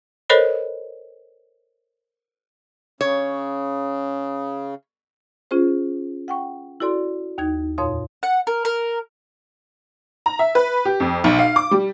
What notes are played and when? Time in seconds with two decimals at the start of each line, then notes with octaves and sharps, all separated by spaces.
0.30 A4 A#4 C5 C#5 D#5 B5
3.01 C#3 C#5
5.51 C#4 F4 G#4 C5
6.28 F#5 G5 C#6
6.80 E4 F#4 A4 D5 C6
7.38 D#2 D#4 G#6
7.78 F2 A#2 C#5 F5 C6 D#6
8.23 F#5
8.47 A#4
8.65 A#4
10.26 A#5
10.39 E5
10.55 B4
10.85 G4
11.00 F2
11.24 B1
11.39 F5
11.56 D6
11.71 G3